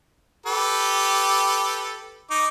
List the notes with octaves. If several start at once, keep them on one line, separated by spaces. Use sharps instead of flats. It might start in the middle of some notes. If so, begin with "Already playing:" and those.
G4 A4 B4
D#4 D6